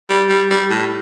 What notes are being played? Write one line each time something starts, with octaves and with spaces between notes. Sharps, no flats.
G3
G3
G3
A2